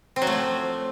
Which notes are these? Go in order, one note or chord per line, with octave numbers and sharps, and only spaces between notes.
C4
F#3
A3
F3